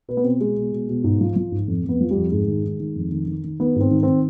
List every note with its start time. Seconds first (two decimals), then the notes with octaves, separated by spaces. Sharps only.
0.08 B2 B4
0.17 B3
0.24 B2 C4
0.41 B2 G#3
0.56 B2
0.72 B2
0.89 B2
1.04 G#2
1.21 F3
1.36 F3
1.52 G#2
1.68 F2
1.84 F2 B3
2.01 F3
2.11 G3
2.16 F2
2.32 G#2 G#3
2.48 D#3
2.64 D#3
2.80 D#3
2.96 F2
3.12 D#3
3.28 D#3
3.44 D#3
3.59 D#3 B3
3.76 G#2 C4
3.91 D#3
4.03 D#3 C4